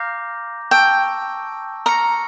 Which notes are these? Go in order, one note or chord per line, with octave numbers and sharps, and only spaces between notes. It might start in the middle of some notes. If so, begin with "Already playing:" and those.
Already playing: F5 A#5 D6 G6 A#6
G5 A5 C#6 E6
A#5 C#6 F6 A#6 C#7